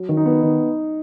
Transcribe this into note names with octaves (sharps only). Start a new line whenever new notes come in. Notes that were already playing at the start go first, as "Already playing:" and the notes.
Already playing: F#3
D#3
D#4
B3
D#3